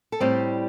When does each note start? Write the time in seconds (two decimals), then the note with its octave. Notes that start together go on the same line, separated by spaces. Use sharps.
0.12 A4
0.20 A2 G3 C4 G4